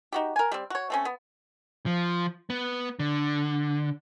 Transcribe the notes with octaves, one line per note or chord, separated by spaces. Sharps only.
D#4 F#4 G4
A#4 G#5
G3 C4
F#4 C#5
A3 C4 C#4
B3
F3
B3
D3